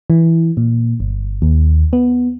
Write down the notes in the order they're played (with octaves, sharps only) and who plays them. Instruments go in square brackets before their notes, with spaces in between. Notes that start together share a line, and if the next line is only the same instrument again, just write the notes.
[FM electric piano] E3
A#2
G1
D#2
B3